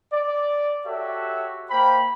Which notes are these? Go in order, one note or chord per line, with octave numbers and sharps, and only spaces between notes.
D5
F#4 G4 A4 C#5 E5
A#3 C5 G5 B5